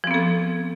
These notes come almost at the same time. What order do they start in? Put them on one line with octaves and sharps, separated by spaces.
F3 C4 B3 A4